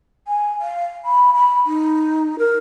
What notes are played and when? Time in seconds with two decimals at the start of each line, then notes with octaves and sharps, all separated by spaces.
0.28 G#5
0.61 F5
1.05 B5
1.34 B5
1.66 D#4
2.39 A#4